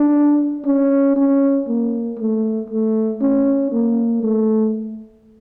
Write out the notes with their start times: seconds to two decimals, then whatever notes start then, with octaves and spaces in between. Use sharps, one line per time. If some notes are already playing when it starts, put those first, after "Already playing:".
Already playing: D4
0.65 C#4
1.16 C#4
1.68 A#3
2.19 A3
2.70 A3
3.21 C#4
3.72 A#3
4.23 A3